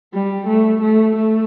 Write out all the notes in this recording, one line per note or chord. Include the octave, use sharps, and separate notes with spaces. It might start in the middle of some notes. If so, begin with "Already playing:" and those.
G3
A3
A3
A3